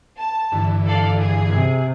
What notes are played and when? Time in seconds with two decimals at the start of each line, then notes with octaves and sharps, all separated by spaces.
0.17 A5
0.52 G2 D3 E3
0.87 A4 D5 F5
1.20 G#4
1.50 C3